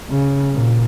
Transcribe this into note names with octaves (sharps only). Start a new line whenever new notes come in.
C#3
A#2